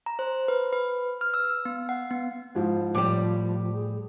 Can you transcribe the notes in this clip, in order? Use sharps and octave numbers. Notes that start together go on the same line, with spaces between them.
A#5
C5
B4
B4
F6
E6
B3
F#5
B3
G#2 F3 E4
A2 F3 G3 D6
G#4